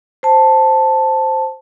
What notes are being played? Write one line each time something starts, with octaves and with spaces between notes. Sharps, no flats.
C5 A5